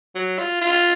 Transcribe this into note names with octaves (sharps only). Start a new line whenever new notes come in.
F#3
F4
F4